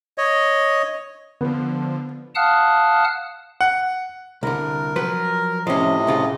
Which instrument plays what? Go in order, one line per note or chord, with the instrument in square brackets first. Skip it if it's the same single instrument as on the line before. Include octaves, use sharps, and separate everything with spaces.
[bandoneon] C#5 D#5
[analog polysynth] D3 F3 [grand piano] B3
[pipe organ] F5 F#5 A5 D#6 F6 F#6
[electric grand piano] F#5
[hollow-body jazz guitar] C2 D3 [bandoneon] A#4
[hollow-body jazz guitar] F3 F#3 B4
[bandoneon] A2 C3 D#5 [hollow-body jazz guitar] F3 C#4
[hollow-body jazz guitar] C2 C#3 F4